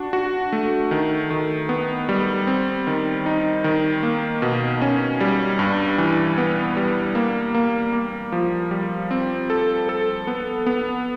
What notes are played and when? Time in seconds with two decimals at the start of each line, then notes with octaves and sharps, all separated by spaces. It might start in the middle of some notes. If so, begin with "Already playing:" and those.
Already playing: D4 F#4
0.13 F#4
0.53 A3
0.91 D#3
1.30 D#3
1.69 B3
2.09 G3
2.47 C4
2.87 D#3
3.26 D#4
3.64 D#3
4.03 A#3
4.42 B2
4.81 C#4
5.20 G3
5.59 G2
5.98 E3
6.38 B3
6.77 G3
7.15 A#3
7.55 A#3
7.93 A#3
8.32 F3
8.71 G3
9.11 C4
9.50 A4
9.89 A4
10.27 B3
10.66 B3